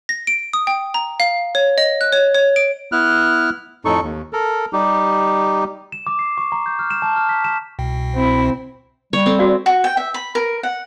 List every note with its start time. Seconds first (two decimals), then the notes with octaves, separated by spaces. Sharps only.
0.09 A#6
0.27 D7
0.53 D#6
0.67 G5
0.94 A#5
1.20 F5
1.55 C#5
1.78 D#5
2.01 F#6
2.12 C#5
2.35 C#5
2.56 D7
2.92 B3 E4 F6 F#6
3.85 F2 A2 D#4 A4 C#6
4.03 D#2
4.33 A4 A#4
4.73 G3 D#4 G4
5.92 E7
6.07 D6
6.19 C7
6.38 C#6
6.52 A#5
6.66 G6
6.79 F6
6.91 E7
7.02 A5
7.16 F6
7.29 B6
7.44 E7
7.79 C2 B2 G5
8.13 C4 E4
9.13 G3 C#5
9.26 C4 A4 C5
9.39 F#4 D5 F5
9.66 F#4
9.84 G5
9.97 E5
10.14 B5
10.35 A#4
10.63 F#5